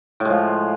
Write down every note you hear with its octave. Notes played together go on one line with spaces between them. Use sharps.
A2 F3 G#3